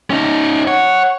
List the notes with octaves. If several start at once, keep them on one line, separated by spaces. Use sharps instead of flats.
C#4 D#4
C#5 F#5